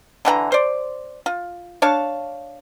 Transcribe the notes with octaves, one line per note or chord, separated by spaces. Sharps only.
D3 E3 F#5 A#5
C5 D5
F4
D4 C#5 F5 A5